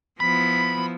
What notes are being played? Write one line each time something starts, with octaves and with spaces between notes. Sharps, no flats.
F3 B3 E4 B5 B6